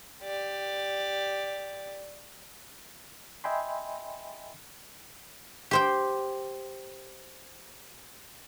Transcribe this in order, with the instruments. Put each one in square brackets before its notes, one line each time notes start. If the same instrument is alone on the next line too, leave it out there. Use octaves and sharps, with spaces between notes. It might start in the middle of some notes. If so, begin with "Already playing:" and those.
[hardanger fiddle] G4 D5
[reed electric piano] D#5 E5 G5 G#5 B5 C6
[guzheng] G4 C5 G5